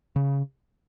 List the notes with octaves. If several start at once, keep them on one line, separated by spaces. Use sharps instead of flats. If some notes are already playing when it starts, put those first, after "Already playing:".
C#3